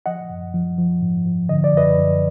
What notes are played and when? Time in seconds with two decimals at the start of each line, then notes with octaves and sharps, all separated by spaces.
0.06 F3 D#5 F#5
0.30 F#2
0.54 F3
0.78 F3
1.02 G#2
1.25 F3
1.49 D3 D#5
1.64 D5
1.73 F#2 B4 D#5
1.97 F#2